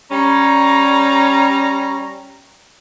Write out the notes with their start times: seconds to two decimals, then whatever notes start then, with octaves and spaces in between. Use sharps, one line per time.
0.11 G3 C#4 A#5